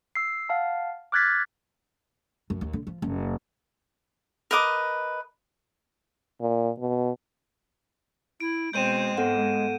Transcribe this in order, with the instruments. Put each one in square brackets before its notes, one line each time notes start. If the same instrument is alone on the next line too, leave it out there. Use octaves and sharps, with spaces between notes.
[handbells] E6 C7
F5 F#5 A5
D6 F6 F#6 G#6 A6 B6
[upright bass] F#2
D#2
D3
F3
F#1
[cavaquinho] A#4 B4 D#5 D6
[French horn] A#2
B2
[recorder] E4 [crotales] D7
[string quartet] B2 C4 [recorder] G#3 [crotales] G6 D#7 E7
[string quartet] G#2 [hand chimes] B3 A4 F#5